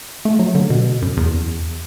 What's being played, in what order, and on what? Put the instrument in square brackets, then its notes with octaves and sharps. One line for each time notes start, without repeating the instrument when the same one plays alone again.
[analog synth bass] A3
F#3
D3
B2
F#2
E2